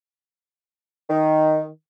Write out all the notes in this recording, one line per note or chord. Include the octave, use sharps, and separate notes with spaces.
D#3